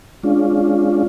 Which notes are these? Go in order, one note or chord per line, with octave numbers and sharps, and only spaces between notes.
G#3 C#4 D4 F4